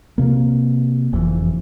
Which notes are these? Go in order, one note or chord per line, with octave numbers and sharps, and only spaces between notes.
C3 A#3
F#1 F2 A#2 E3